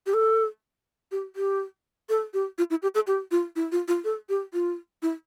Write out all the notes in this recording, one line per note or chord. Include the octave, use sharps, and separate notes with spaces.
G4
A4
G4
G4
A4
G4
F4
E4
G4
A4
G4
F4
E4
F4
F4
A4
G4
F4
E4